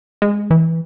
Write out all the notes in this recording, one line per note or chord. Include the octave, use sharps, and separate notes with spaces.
G#3
E3